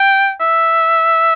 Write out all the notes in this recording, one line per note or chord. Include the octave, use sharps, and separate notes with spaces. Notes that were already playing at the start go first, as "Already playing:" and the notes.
Already playing: G5
E5